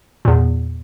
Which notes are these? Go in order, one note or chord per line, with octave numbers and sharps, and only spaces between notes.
E2 A#2